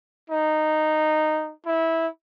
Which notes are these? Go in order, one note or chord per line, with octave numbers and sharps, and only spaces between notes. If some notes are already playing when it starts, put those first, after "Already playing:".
D#4
E4